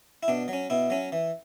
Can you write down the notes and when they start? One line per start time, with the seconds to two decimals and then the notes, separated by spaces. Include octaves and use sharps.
0.23 E4
0.28 B2 D4
0.48 F#3
0.53 C#4
0.70 B2 E4
0.90 F#3 C#4
1.12 E3